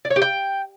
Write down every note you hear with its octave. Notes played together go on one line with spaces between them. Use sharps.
D5
C#5
G4
G5